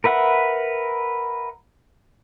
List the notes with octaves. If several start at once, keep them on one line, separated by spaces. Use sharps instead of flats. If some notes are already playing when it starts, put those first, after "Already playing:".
A#4 B4 E5 F#5